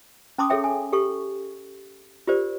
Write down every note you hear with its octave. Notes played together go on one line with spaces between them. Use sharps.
C#4 A5 C6 D6 D#6
G#4 A4 C#5 E5 G5
G#5
G4 A4 C#6
F4 G4 A#4 C5 D5